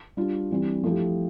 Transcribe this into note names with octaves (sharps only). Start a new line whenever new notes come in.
G3 D4 F4
E3 G3 C4
F3 A3 E4 G4